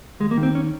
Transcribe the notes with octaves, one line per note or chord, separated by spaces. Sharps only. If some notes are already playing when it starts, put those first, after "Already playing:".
D#2 G#3
A#3
D#3
C4
C#4